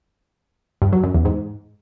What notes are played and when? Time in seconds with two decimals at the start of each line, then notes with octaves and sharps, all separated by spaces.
0.82 G2
0.93 F#3
1.03 F#2
1.14 E2
1.25 G#2